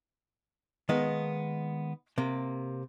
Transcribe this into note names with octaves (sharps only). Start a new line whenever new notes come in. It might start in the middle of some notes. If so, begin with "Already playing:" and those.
D#3 G#3 A#3 B3
C3 A#3